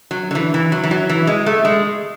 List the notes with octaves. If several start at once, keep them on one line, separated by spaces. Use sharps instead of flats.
F#3
D3
E3
E3
F#3
E3
F#3
E3
G#3
A3
G#3